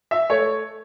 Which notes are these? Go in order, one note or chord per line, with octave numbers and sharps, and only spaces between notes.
E5
A3 C#5